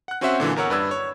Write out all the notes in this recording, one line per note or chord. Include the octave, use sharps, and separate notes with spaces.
F#5 F#6
C4 C#4 F#4 C5 E5 F#5
A#2 D3 E3 F#3
E2 A#4 C#5 F#5 E6
G2 B4 D5 E6 G#6
C#5